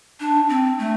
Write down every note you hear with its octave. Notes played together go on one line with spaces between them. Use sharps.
D4
C4
A3